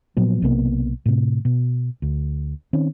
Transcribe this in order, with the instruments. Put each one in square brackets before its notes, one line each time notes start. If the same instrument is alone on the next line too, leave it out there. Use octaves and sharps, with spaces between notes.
[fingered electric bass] A#2 F3 F#3 B3
B1 C3 A#3 B3
A2 C3
B2
D2
D#3 C4 C#4